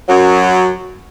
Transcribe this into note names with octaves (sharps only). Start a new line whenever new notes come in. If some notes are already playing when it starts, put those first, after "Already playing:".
F#2 F#3